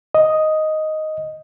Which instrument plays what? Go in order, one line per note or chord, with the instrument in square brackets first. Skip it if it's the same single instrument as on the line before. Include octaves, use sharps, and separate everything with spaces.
[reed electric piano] D#5